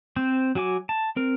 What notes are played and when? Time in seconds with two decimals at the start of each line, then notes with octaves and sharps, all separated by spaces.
0.16 C4 C5
0.55 F#3 F#4 G#5 D6
0.89 A5
1.16 C4 A#4